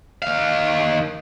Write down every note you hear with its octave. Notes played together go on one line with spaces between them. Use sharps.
D#3 F5